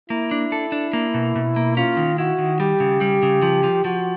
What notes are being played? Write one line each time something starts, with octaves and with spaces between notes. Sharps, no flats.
A#3 E4
D4
A4
D4
A#3
B2
B2
A#3
C#4 F4
D#3
E4 F#4
D#3
G3 G4
C#3
G3
C#3
F3
F3
F3 F#4